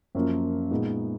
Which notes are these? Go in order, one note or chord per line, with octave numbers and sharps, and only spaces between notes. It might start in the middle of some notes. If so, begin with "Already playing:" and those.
F#2 F3 A#3 F4
A#2 G#3 B3 D#4